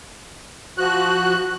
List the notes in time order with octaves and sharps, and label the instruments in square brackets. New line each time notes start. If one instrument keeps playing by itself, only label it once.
[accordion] F3 F#4 F#6